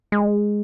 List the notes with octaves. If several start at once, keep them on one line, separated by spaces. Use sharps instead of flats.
G#3